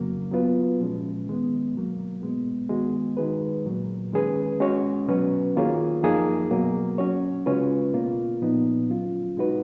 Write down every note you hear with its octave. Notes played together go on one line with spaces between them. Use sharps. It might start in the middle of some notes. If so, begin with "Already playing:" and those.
Already playing: F2 C#3 F#3 A#3
F#3 B3 F4 B4
A#2 F3 G#3 C#4
D#3 G#3 B3
B2 F#3 A#3
B2 G#3 B3
D#3 G#3 B3 F#4
D#3 G#3 D#4 G#4 B4
A#2 F#3 A#3
D#3 G#3 C#4 G#4 B4
G#3 C#4 F#4 C#5
B2 F#3 C#4 F#4 B4
D#3 A#3 F4 G#4 C#5
F#2 F3 A#3 D#4 G#4
B2 F#3 A#3
F#3 C#4 F#4 C#5
C#3 G#3 C#4 F4 B4
B2 A#3 F4
A#2 F3 B3 D#4
F#3 C#4 F4
B2 G#3 D#4 F#4 B4